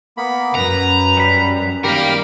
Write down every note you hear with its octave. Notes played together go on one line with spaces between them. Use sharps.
A#3 B3 B5
F#2 B4 A#5
G3 B5
D#3 G3 G4 A#4 F5 B5